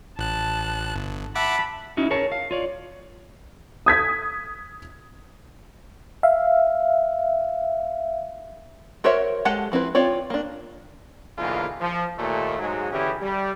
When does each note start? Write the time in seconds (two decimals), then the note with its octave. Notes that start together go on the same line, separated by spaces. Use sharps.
0.19 A1 A5 F#6
0.96 G1
1.35 E5 F#5 A5 B5 D6
1.97 C#4 D#4 E4 F#4
2.10 G#4 A#4 C#5 A5
2.32 F5
2.51 F4 C#5 D5
3.86 D#6 G#6 B6
6.23 E5 F5
9.04 F#4 A#4 C5 C#5 E5
9.45 G#3 G4 A4 F#5 A5
9.72 F3 C4 E4 B4
9.95 C4 F4 C#5 D5
10.30 A#3 D4
11.38 B1 G#2 D3 E3 A#3 F4
11.80 F3
12.18 D#2 A#2 A3
12.58 G#2 F#3 G#3
12.90 D3 E3 C#4 E4 G4 G#4
13.21 G3